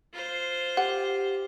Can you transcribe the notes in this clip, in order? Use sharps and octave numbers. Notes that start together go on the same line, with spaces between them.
F4 C5
G4 F#5